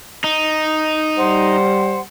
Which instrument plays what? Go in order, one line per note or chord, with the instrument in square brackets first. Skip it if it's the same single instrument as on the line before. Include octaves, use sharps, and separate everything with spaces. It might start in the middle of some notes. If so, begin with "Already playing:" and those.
[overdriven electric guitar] D#4
[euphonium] G3 [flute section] C5 F#5